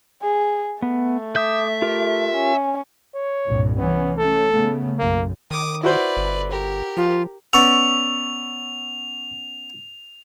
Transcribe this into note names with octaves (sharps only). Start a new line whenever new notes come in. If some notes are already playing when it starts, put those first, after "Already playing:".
G#4
A3 B3
E5 D6 D#6 G6
F4 G4 A#4
C#4
C#5
C2 G2 A#2
E3 B3 C#4
A3 C#4 A4
C#3 A3 B3
B1 F#2 A#3
D#3 D6 D#6
E4 F#4 B4 C5 D5
G1
G4 A#4
F3 F4
B3 C#4 D5 C#6 E6 F7